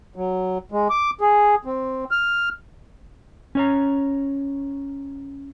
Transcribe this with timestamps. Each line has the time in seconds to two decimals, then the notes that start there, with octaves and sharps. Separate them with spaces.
0.16 F#3
0.72 G#3
0.90 D6
1.21 G#4
1.65 C4
2.11 F6
3.55 C#4 C#5 A#5